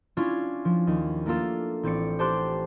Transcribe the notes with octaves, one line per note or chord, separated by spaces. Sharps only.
C#4 D4 E4 F4 C#5
F3
D#2
A3 A#3 D4 F4 A4
A1 C4 D5 C#7
G4 C5 A5 C6 D6 F#6